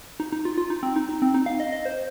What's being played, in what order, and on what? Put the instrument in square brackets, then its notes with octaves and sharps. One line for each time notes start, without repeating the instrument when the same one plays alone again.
[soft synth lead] D#4
D#4
F4
F4
D#4
C4
D#4
D#4
C4
D#4
F5
D#5
D#5
C5